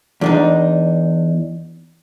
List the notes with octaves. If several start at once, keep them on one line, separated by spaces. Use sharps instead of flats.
E2 D4 D#4